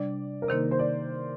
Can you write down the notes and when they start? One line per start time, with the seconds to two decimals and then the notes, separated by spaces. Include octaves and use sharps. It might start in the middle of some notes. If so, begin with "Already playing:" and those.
Already playing: C3 G3 D4 D5
0.42 A#4
0.48 C3 D#3 A#3 D#4 C5
0.71 C5
0.79 D5